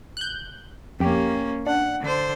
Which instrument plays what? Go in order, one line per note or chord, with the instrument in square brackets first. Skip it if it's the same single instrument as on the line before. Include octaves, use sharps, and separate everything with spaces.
[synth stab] F#6 G6
[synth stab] F2 G4 [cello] A#3 C#4
[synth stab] D4 [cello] F#5
[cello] D3 C5